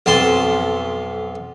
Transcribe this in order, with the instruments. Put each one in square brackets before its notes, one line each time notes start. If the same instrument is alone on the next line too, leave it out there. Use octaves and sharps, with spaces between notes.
[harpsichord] B1 F2 A5 C6